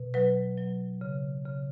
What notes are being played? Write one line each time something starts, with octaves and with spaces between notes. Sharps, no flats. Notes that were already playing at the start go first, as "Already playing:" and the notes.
Already playing: B2
F#3 B4
F#3
C#3
C#3